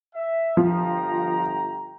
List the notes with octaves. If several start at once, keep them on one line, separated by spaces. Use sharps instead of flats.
E5
G1 F3 G5 A#5